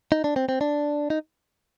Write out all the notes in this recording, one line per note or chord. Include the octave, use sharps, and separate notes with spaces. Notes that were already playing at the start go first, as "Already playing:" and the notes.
D#4
D4
C4
C4
D4
D#4